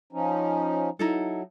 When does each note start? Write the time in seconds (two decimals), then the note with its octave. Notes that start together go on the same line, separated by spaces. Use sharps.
0.13 F3 C#4 D#4
0.99 F#3 D#4 E4 A4